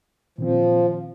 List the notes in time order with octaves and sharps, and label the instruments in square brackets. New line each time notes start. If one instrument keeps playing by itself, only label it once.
[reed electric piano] A#2 D#3 C4 [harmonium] F3